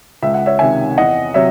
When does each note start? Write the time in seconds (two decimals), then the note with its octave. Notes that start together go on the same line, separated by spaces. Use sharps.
0.22 C#2 E5
0.34 F#5
0.46 C#5 E5
0.59 C3 D#3 E5 G#5
0.97 E2 D#5 F#5
1.34 C3 F#3 C#5 E5